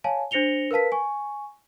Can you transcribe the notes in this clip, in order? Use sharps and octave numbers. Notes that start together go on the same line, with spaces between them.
C#5 F5 G#5 A5
D4 C5 A#6 C#7 F7 G7
A#4 B4 F5 A5 B6
G#5 C#6